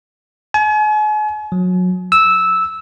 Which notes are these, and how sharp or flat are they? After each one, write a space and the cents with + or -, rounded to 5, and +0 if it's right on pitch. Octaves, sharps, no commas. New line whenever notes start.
G#5 +40
F#3 -30
E6 -10